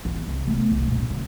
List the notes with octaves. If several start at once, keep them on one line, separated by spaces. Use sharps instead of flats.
E3 B3
C2
A3 B3
C2 A2
G2 A#2
C#3